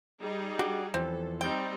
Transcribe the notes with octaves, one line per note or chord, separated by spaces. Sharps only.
G3 D#4 G#4
D4 F#4 G4
E2 E3 F3 C4 A4
G3 C4 D#4 G5